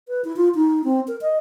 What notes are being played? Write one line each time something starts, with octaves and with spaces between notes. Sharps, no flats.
B4
E4
F4
D#4
C4
A#4
D#5